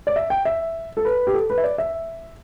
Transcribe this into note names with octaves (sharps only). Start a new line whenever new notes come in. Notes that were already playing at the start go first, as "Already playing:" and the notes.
D5
E5
G5
E5
A4
B4
G4
A4
B4
E5
D5
E5